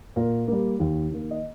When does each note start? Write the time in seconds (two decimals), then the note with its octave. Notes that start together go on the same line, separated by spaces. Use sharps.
0.16 A#2 A#4
0.48 G3 A#3
0.80 D#2
1.11 D#3 A#3
1.31 D#5